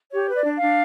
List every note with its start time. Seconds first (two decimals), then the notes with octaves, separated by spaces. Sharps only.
0.12 G4 C#5
0.28 B4
0.34 D5
0.45 D4
0.56 F5
0.62 D4